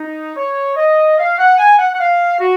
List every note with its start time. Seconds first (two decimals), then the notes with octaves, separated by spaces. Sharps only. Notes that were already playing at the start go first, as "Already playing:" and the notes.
Already playing: D#4
0.36 C#5
0.76 D#5
1.18 F5
1.38 F#5
1.58 G#5
1.78 F#5
1.93 F#5
2.00 F5
2.40 F#4